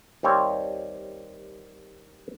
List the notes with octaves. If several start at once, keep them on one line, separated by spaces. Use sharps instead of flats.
D#2 G3 C4 C#5